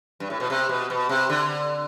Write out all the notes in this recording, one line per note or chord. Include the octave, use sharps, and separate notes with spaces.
G2
A2
B2
C3
B2
B2
C3
D3